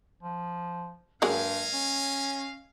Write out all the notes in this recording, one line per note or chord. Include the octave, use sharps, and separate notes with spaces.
F3
G2 F#3 G#3 A#3 C#5 D#5 F5
C#4